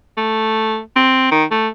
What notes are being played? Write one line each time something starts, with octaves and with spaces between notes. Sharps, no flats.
A3
C4
D#3
A3